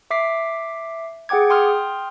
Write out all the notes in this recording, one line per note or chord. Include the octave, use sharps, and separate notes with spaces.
E5 D6 B6 C7
G#4 F#5 G5 D6 G#6
G5 C6 D#6 F6